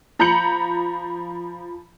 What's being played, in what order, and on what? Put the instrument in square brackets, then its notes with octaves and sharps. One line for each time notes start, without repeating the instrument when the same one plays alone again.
[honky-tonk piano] F3 A#5 B5 G6 C#7 F#7